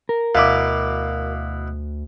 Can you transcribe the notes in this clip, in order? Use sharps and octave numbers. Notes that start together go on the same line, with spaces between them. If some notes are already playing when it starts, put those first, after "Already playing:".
A#4
D2 B2 E4 F5 D6